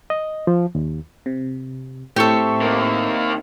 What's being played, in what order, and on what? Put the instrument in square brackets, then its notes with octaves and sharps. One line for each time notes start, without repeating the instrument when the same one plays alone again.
[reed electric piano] D#5
F3
D#2
[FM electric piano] C3
[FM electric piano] A2 C#6 [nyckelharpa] C4 E5 [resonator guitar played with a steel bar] G4 A4
[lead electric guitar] D#3 A#3